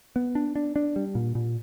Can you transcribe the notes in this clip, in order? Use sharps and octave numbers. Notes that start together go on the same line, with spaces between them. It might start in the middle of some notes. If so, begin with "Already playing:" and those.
B3
D4
D4
D4
G3
A#2
A#2